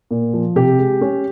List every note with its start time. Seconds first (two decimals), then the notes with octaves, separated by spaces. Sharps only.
0.11 A#2
0.34 F3
0.56 C3 G4
0.78 G#3
1.01 C#4